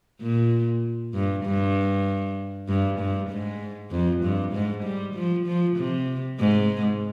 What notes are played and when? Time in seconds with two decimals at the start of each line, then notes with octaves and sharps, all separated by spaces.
0.21 A#2
1.14 G2
1.44 G2
2.68 G2
2.99 G2
3.30 G#2
3.91 F2
4.22 G2
4.53 G#2
4.84 G3
5.15 F3
5.46 F3
5.77 C3
6.39 G#2